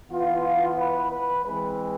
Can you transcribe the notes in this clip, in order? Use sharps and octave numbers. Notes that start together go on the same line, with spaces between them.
E3 B3 F4
B4
B4
E3 G#3 C4 B4